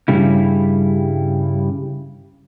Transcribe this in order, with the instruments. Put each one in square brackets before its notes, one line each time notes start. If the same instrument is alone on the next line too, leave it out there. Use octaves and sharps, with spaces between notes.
[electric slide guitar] G2 C#3 G3 E4